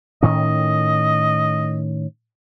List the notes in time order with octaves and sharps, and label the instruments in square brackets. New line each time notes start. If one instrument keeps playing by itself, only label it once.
[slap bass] A2 D#3 C#4 [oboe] D#5